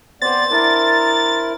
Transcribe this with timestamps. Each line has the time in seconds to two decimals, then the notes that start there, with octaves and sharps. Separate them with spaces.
0.22 B3 C4 C5 D5 A6
0.51 D4 E4 A#4 C6